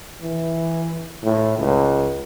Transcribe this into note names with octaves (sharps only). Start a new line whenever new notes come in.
E3
A2
C#2